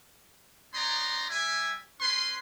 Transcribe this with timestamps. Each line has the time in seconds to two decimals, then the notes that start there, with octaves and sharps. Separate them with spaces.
0.74 B3 D#4 C#5 D5 A#5 C6
1.29 G3 G4 E5 G#5
2.00 C#4 B4 C6